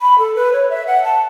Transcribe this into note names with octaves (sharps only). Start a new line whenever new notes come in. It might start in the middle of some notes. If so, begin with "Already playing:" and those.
B5
A4
B4
C#5
E5
F#5
A5